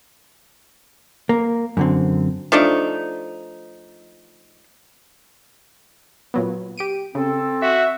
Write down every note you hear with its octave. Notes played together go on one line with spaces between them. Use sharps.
A#3
F#2 D3 C4
F3 A3 D4 D#4
A#2 F#3 B3
G4 D7 D#7
C#3 C4 A4
F#4 E5